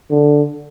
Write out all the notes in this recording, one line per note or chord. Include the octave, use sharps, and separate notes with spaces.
D3